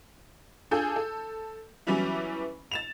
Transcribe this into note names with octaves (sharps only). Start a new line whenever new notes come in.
D4 F4 G#4 A4 G6
A4
E3 F#3 G3 B3 C#4 E4
A6 E7 F7